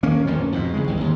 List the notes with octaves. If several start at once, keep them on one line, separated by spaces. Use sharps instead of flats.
D#1 D#3 A#3 C#4
D1 F2 A#2 C#4
F2 G#2 B2
E2 C#3 G#3
G1 C2
D#2 G#2